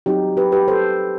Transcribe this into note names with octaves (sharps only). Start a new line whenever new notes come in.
F#3 C4 D#4 G4
G4 B4
G4 B4
A4 C5